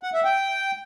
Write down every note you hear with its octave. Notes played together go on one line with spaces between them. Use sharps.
F#5
E5
G5